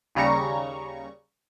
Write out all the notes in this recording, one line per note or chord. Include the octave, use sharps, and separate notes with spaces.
D#2 C#3 G3 A#5 C#6